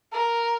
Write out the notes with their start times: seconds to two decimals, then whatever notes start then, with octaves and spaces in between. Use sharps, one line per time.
0.12 A#4